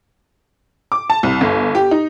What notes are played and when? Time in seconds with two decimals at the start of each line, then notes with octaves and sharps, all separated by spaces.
0.92 D6
1.10 A5
1.23 C2
1.41 G1
1.75 G4
1.91 D#4